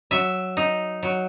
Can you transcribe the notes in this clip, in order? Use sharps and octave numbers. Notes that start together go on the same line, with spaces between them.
F#3 E5
D#4
F#3